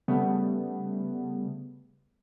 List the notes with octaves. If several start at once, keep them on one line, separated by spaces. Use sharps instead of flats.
C#3 G3 A3 B3